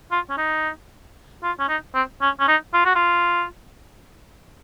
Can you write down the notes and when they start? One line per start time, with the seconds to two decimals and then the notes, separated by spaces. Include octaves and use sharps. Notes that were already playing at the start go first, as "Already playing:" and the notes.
0.12 F4
0.30 C#4
0.38 D#4
1.43 F4
1.60 C#4
1.69 D#4
1.95 C4
2.21 C#4
2.40 C#4
2.48 D#4
2.74 F4
2.85 F#4
2.95 F4